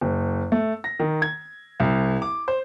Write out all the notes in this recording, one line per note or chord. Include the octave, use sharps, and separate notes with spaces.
F#1
A3
A#6
D#3
G#6
C2
D6
C5